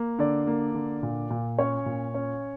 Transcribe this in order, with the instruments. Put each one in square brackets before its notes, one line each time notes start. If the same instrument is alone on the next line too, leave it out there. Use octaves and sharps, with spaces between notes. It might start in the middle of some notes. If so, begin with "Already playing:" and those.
Already playing: [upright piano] A#3
D3 D5
A#3
D3
A#2
A#2
C#4 C#5
A#2
C#4